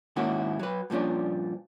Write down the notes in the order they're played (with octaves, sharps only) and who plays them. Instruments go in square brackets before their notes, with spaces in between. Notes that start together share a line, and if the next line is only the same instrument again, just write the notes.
[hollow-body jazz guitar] G#2 D#3 A#3 C#4 E4 F#4
F#3 B4
G2 A#2 F3 C#4 D4